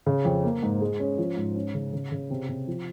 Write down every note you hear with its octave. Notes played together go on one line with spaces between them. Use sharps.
C#3
F2
A#3
G#2
G#3
C#4
F3
G#2
C#4
C#3
C#3
C#3
C3
C3
F3